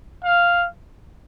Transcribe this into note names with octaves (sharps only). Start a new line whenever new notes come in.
F5